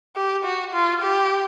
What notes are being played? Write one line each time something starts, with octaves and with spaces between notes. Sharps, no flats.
G4
F#4
F4
G4